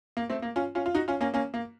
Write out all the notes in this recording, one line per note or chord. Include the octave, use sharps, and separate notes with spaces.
A#3
A3 C4
A#3
C#4 F4
C#4 F4
F4
D#4 F#4
C#4 F4
A#3 C#4
A#3 C#4
A#3